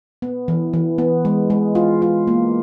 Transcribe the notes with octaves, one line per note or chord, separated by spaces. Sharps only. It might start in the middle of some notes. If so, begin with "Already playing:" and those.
B3
E3
E3
B3
G#3
G#3
F4
F4
A#3